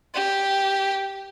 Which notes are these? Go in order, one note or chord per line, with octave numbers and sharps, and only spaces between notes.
G4